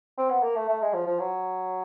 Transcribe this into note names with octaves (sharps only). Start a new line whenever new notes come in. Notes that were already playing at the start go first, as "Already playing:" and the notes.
C4
B3
A#3
A3
A3
G#3
F3
F3
F#3